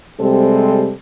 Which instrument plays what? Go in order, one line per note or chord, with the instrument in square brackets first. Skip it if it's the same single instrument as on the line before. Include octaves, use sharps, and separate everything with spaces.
[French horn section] C3 G3 G#3 C4 A4